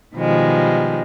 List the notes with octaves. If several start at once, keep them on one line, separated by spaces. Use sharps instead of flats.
B2 D#3 F3 G3 G#3